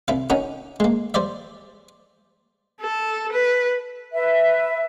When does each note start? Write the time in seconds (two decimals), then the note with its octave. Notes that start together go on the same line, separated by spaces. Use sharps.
0.08 C2 E4 F5
0.30 C#4 D#4 F#4 A#4
0.80 G#3 A#3
1.14 G3 C5 D5 E5
2.80 A4
3.32 B4
4.14 B4 E5